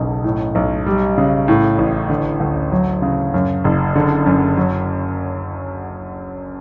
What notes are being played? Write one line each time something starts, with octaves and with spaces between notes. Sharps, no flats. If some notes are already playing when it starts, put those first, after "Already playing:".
Already playing: F#1 B1 B2
A2
B1
G3
C#3
A2
A1
D3
D2
F#3
C#3
F#2
F#1
D3
F#2
F#3